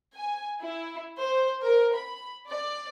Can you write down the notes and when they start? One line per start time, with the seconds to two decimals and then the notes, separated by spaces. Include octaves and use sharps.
0.14 G#5
0.61 E4
1.20 C5
1.63 A#4
1.96 B5
2.49 D5